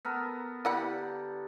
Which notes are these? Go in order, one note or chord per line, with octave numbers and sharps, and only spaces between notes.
B3 A4 A#4
D3 E4 G4 F#5 B5